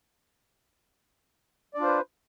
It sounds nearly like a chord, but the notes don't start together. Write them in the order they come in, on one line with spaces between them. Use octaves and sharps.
D5 D4 F4 C5 B4